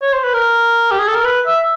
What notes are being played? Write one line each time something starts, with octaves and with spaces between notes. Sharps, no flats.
C#5
C5
B4
A#4
G4
G#4
A4
A#4
B4
E5